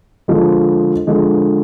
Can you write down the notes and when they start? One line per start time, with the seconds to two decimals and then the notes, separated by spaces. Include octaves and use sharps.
0.28 D3 F3 G#3
1.07 D3 F3 G#3